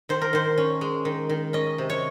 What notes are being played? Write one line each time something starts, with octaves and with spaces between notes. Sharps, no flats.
D#3 C5
A#4
D#3 C5
C#4
G#3
D#3
D#3
C#4 D#5
C3
C#5